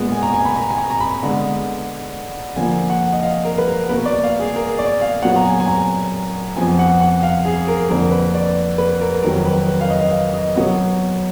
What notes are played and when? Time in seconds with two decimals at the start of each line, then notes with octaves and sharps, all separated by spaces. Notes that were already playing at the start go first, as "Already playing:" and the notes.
Already playing: A#2 G#3 B3
0.12 G#5
0.23 A#5
0.34 G#5
0.45 B5
0.56 A#5
0.71 G#5
0.78 A#5
0.90 A#5
1.01 B5
1.23 D3 G#3 B3
2.56 D3 F3 A#3 G#5
2.90 F#5
3.12 D#5
3.23 F5
3.45 A#4
3.58 B4
3.68 A#4
3.89 B2 A#3 B4
4.06 D5
4.23 F5
4.40 G#4
4.56 A#4
4.79 D5
5.01 F5
5.23 A#2 F#3 B3 F#5
5.36 A#5
5.45 G#5
5.60 G#5
5.68 A#5
6.56 F2 F3 B3 G#5
6.79 F#5
7.01 F#5
7.23 F5
7.45 G#4
7.68 A#4
7.89 F2 D3 F3 A#3 A#4
8.11 B4
8.34 D5
8.78 B4
9.01 A#4
9.22 F2 D#3 F#3 A#4
9.45 B4
9.68 B4
9.81 F5
9.90 D#5
10.12 F5
10.34 D#5
10.56 B2 F#3 B3